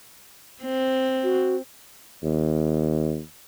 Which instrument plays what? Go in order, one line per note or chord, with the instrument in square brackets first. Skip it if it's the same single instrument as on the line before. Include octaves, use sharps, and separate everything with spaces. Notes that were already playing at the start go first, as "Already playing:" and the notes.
[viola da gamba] C4
[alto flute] F#4
[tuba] D#2